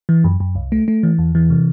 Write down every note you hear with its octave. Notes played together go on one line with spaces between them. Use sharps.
E3
F#2
F#2
C2
A3
A3
E3
E2
E3
C3